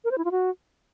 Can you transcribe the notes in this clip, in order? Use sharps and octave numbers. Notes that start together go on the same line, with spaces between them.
A#4
C5
E4
F4
F#4